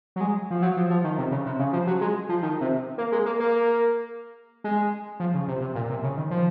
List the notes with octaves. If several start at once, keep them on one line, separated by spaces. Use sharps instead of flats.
F#3
G#3
F3
F#3
F3
F3
D#3
C3
C#3
C3
C#3
F3
F#3
G#3
F3
D#3
C3
A#3
G#3
A#3
A#3
G#3
F3
C#3
C3
C3
A#2
C3
C#3
D#3
F3